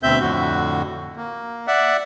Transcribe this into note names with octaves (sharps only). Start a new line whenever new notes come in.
D2 B2 C4 E5 G6
F2 A2 D3 F#4
A#3
D5 E5 F#5